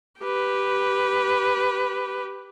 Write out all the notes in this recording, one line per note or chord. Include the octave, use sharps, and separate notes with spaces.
G4 B4